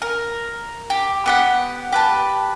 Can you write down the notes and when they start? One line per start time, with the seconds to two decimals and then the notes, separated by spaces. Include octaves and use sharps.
0.02 A#4
0.90 G4
1.26 B3 G4 F#5
1.92 G4 B4 A5